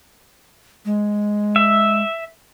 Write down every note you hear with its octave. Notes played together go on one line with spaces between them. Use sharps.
G#3
E5